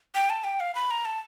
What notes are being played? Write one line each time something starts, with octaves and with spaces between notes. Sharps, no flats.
G5
A5
G5
F5
B5
A#5
A5